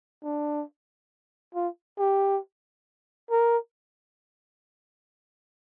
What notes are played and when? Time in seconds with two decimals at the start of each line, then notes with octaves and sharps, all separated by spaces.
0.24 D4
1.55 F4
1.99 G4
3.31 A#4